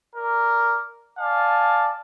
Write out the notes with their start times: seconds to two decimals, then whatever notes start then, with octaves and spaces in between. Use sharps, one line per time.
0.15 A#4 D5
1.19 D5 F5 G#5 A5